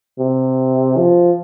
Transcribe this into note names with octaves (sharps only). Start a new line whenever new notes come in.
C3
F3